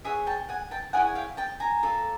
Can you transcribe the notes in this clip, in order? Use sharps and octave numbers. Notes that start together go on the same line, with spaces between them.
G#4 C#5 E5 F#5
G5 A5
F#5 G#5
G5 A5
E4 G#4 C#5 F#5 G#5
F5 G5
G5 A5
G#5 A#5
F4 A4 D5